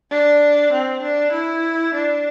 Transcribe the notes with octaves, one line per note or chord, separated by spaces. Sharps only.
D4
C4
D4
E4
D4